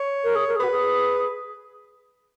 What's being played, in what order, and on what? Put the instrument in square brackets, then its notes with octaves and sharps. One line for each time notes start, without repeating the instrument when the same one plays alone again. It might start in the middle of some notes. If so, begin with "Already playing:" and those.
Already playing: [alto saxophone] C#5
[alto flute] A#4
G#4
A#4
G#4
[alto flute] F#4 [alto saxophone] B4
[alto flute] G#4